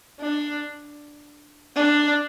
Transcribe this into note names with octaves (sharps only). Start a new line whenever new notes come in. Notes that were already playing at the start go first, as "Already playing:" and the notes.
D4
D4